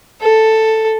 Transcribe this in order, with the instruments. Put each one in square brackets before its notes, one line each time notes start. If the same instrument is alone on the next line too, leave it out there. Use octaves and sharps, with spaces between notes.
[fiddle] A4